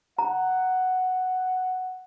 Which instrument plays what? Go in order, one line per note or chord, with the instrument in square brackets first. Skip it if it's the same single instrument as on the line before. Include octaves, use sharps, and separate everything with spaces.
[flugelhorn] F#5 [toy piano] A#5